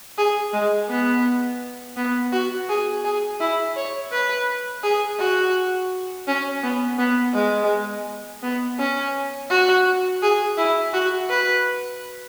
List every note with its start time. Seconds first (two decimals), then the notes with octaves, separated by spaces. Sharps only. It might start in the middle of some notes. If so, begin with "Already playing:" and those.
0.18 G#4
0.53 G#3
0.89 B3
1.97 B3
2.32 F#4
2.69 G#4
3.05 G#4
3.40 E4
3.76 C#5
4.12 B4
4.83 G#4
5.20 F#4
6.27 C#4
6.64 B3
6.98 B3
7.34 G#3
8.43 B3
8.79 C#4
9.50 F#4
10.22 G#4
10.57 E4
10.93 F#4
11.30 B4